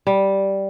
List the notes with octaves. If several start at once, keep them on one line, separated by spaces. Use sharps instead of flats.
G3